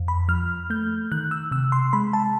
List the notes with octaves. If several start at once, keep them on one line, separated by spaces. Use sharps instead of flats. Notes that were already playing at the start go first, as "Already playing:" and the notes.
Already playing: F2
B5
F3 F6
A3 G6
D#3 F#6
E6
C3 E6
C6
G#3 B5
A5